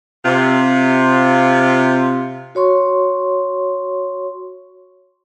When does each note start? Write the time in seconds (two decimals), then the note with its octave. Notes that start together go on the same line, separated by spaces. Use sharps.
0.25 C3 F4
2.55 F#4 C#5 C6 C#6